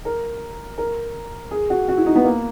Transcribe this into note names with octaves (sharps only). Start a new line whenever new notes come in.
A#4
A#4
G#4
F#4
F#4
E4
D#4
B3
A#3